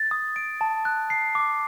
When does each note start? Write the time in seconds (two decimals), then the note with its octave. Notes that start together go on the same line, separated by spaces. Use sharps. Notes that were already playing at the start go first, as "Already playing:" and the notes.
Already playing: A6
0.11 D#6
0.36 D7
0.61 A5
0.85 F#6
1.10 C7
1.35 D6